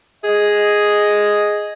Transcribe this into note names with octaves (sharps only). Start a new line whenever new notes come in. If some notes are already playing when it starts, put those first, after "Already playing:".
G#4 D#5